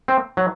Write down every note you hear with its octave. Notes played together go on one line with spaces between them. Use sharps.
C4
F#3